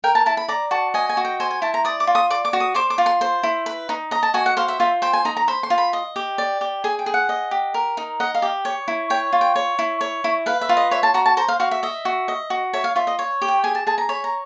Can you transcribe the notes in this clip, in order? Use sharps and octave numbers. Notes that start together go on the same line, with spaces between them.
A#4 G5
A5
E4 A5
B5
D5 A#5
F#4 A5
D#5 G#5
G#5
F#4
G5
C5 G#5
G#5
E4 A5
A#5
D5 D#6
D6
F4
D#6
D5 D6
D6
F#4
D#6
C5 D6
D6
F4
C6
C5
E4
B4
D#4
D#5 A#5
A5
F#4 G#5
F#5
C5 F5
E5
F4 E5
C5 G5
G#5
D#4 A#5
A#5
C5 B5
C6
F4
B5
D#5
G4
D5
G4
G#4 G#5
G5
G#4
F#5
D#5
G4
A#4
D#4
D#5 F#5
F5
G4
C#5
E4
C#5 G5
F4
G5
C#5
E4
C#5
E4
B4 F5
E5
F4
D#5
C#5 E5
A5
F#4 A#5
A5
C5 A#5
F5
F#4 F5
E5
D#5 E5
F#4
D#5
F#4
C#5 E5
F5
F4 E5
D#5
C#5
G4
G5
G#4 G#5
A5
G#4 A5
A#5
C#5 B5
A#5